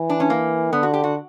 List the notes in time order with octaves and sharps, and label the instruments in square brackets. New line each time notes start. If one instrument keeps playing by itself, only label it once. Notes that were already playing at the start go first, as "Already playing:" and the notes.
Already playing: [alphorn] E3
[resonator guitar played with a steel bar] D4
C#4
A#3
[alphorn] D3 [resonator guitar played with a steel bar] B3
[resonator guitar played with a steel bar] F#4
G4
F#4